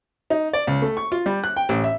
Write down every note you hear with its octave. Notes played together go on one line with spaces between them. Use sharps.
D#4
D5
C#2
A3
C#6
F4
G3
F#6
G5
A1
E5